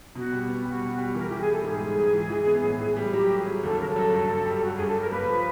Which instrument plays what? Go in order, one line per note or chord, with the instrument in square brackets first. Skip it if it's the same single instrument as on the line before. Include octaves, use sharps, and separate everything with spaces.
[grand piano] B2 [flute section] F#4
[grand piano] G3
B3
[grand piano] G3 [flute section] F#4
[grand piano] B2
G3
[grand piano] E3 [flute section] A#4
[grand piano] E3 [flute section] G4
[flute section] G#4
[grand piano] G3 [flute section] A4
[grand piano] G#2 [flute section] G#4
[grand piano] G#2
G#2
E3
E3
B3
A2
E3
G3
[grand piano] F#3 [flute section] G4
[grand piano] A3
[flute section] G#4
[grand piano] F#3
[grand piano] D#2 [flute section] A4
[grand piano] C#3 [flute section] A#4
[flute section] A4
[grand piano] F#3
G2
G2
G3
[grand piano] G3 [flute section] F#4
[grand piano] G2 [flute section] G#4
[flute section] A4
[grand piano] G3 [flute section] A#4
[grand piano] A#3 [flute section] B4
[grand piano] F3